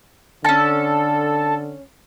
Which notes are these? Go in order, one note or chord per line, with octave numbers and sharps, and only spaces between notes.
D3 C#4 A4 A5